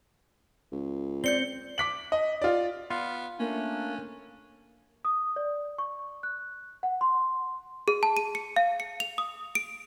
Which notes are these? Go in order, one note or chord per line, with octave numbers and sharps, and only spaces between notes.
C#2
C4 D5 G6 C#7 G7
D6 B6 F#7
D#5
F4 D5
B3 F4
A3 A#3 C#4 D4
D#6
D5
C#6
F#6
F#5
C6
G#4
A5
D#7
C#7
F5
C#7
F7
D#6
D7